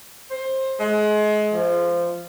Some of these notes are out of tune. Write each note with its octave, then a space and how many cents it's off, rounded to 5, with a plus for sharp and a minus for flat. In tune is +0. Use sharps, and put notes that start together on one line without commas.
C5 +20
G#3 +30
F3 -15